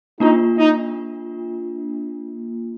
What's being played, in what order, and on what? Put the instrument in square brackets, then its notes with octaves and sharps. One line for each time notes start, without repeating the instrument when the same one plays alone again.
[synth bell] A#3 D4 F4 [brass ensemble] D#4
[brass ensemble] D#4